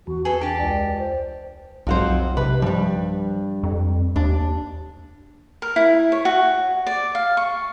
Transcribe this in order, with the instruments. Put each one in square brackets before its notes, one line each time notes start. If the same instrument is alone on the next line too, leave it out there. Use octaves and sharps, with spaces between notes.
[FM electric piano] E2 [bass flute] F#4
[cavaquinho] G#4 A4 [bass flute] B4
[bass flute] D4 [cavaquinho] G4 A5
[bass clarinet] C#2 [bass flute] D5
[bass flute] C5
[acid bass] B1 [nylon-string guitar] F2 F#3 C5
[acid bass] C3 [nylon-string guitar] B4
[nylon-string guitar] G2 G3 [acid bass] F3
[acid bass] F2
[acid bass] D#2 [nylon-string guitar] D4
[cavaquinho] A#4
E4
C#5
F#4
D5
F5
C#6